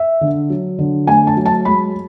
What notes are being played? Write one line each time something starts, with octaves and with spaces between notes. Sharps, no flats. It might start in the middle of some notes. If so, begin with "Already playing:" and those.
Already playing: E5
D3
F#3
D3
A3 G#5
A5
F#3
A5
G#3 B5